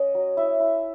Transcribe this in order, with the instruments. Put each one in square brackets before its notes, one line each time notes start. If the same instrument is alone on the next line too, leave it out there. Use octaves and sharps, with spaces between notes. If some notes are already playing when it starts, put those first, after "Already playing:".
Already playing: [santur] C#4 C#5 D#5
F#3
E4 E5
E4